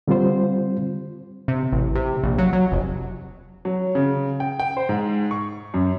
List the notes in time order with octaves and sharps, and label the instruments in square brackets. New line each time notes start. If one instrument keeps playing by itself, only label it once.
[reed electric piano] D3 G3 C4 F4 C5
[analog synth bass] C3
A1
C3
A#1
F#3
F#3
F1
[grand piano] F#3
C#3
G5
G5
C5
G#2
C#6
F#2